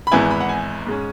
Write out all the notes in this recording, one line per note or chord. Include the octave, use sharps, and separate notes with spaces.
B5
G#1 G#2 E3 B3 E4 G#5
B5
F#5
G#5
G#2 G#3 C#4